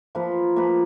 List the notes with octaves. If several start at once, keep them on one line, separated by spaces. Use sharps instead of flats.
F3 A#3 F4 B4
F3 A#3 F4 B4